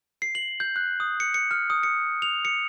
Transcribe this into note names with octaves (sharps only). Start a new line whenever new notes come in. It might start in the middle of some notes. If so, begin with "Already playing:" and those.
C7
F#7
G6
F#6
D#6
C#7
C#7
F6
D#6
C#7
F7
C#7